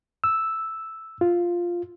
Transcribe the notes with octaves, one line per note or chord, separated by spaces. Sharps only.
E6
F4